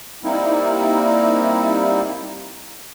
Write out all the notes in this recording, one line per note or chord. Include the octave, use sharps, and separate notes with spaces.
G3 A#3 C4 D#4 E4